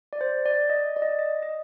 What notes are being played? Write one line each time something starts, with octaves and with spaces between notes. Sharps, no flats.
D5
C5
D5
D#5
D5
D#5
D#5
D#5